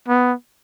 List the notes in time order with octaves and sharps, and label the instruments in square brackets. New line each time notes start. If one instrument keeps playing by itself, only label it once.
[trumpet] B3